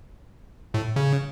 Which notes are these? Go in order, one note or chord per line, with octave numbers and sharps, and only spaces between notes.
A2
C#3